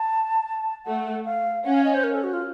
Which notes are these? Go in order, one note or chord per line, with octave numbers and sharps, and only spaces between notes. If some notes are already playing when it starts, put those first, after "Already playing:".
Already playing: A5
A3 F#5
F5
C#4 F#5
F5
D#5
C5
A#4
A4
F#4
F4